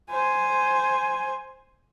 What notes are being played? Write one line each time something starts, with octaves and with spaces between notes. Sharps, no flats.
C5 G#5